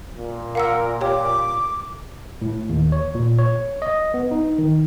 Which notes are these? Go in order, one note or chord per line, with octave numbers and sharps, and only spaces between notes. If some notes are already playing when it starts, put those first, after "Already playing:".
A#2
A#4 F5 F#5 E6
G4 C#5 G5 D6
A2
D#2
C#5
A#2
C#5
D#5
B3
D#4
D#3